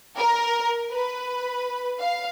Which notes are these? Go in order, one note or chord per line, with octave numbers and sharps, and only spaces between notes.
A#4
B4
F5